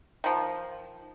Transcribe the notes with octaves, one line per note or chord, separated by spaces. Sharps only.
D#3 F3